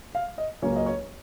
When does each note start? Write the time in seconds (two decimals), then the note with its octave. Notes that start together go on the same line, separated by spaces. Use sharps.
0.15 F5
0.38 D#5
0.62 C#2 C#3 F#3 A#3 C#4 C#5
0.76 D#5
0.86 C#5